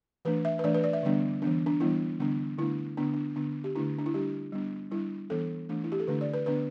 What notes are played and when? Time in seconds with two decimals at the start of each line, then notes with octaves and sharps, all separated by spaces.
0.25 E3 A3 D4 B4
0.45 E5
0.59 B4
0.64 E3 A3 D4 D5
0.74 B4
0.84 D5
0.93 E5
1.03 D3 G3 B3 D4
1.42 E3 B3 D4
1.66 D4
1.80 E3 G3 B3 D4 E4
2.20 D3 G3 B3 D4
2.58 D3 A3 D4 E4
2.97 D3 B3 D4
3.14 D4
3.36 D3 B3 D4
3.64 G4
3.75 D3 A3 D4 E4
3.98 D4
4.06 E4
4.14 G3 D4 G4
4.52 G3 B3 D4
4.91 G3 D4 E4
5.30 E3 B3 D4 A4
5.69 E3 A3 D4
5.84 E4
5.92 G4
6.00 A4
6.07 D3 A3 D4 B4
6.21 D5
6.34 B4
6.46 D3 B3 D4 B4